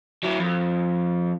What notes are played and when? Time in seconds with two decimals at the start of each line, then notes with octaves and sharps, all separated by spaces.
0.23 F#3 E4
0.39 F2